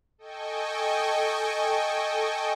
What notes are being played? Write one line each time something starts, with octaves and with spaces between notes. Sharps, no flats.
A4 D#5 G5 G#5 C#6